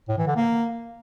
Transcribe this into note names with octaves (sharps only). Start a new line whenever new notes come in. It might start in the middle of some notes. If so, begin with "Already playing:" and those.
A2
E3
D3
A#3